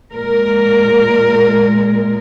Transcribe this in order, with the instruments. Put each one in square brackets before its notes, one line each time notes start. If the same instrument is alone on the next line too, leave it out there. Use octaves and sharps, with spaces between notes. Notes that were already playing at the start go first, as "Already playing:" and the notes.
[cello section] A#2 G#3 A#4